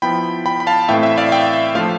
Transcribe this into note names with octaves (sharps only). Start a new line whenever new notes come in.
F3 B3 E4 G5 B5
G5 B5
B5
F5 A5
A2 E3 A3 C4 E4 E5 G5
E5
D5 F5
E5 G5
F3 A3 D4 F4 F5